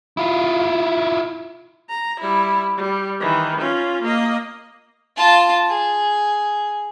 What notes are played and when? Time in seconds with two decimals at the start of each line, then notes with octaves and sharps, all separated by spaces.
0.17 E4 F4
1.90 A#5
2.21 G3 E4
2.77 G3
3.20 D#3 E3
3.60 C#4 F4
4.03 A#3 D#5
5.17 F4 A5
5.69 G#4